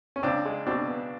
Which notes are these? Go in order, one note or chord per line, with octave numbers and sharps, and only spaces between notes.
C#4
C#2 C4 D4
G#3
B2 C4 D4
B3